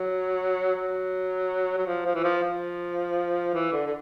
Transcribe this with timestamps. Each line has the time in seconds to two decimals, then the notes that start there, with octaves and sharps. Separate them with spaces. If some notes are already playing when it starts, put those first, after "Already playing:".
Already playing: F#3
0.75 F#3
1.78 F#3
1.87 F3
2.05 F3
2.15 E3
2.24 F3
2.43 F3
3.54 E3
3.73 D3
3.86 D3